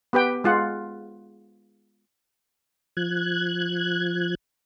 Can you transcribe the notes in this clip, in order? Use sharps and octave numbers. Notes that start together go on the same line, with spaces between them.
B3 G4 B4 G5
G#3 F4 F#5
F3 F#6 G#6